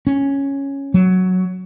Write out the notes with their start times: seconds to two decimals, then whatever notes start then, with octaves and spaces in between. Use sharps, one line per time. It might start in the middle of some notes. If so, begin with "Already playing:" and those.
0.07 C#4
0.94 F#3